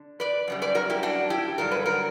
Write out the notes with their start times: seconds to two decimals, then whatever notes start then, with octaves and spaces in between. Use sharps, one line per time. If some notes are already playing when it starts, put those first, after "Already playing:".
Already playing: D3
0.20 B4 D5
0.48 F#2 C#3 G3
0.62 B4 D5
0.75 F#4 A#4
0.90 E4 G4
1.03 D4 F#4
1.30 E4 G4
1.58 G2 D3 F#3 A#4
1.71 B4
1.86 F#4 A#4